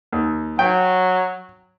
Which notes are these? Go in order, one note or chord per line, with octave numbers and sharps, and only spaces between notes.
D#2
F#3 G5